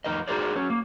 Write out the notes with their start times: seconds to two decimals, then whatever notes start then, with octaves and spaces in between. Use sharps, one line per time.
0.04 F2 D#4 A#4 D#5
0.28 D#4 F#4 G#4 A#4 C5 D5
0.56 F#3 C#4
0.70 A#3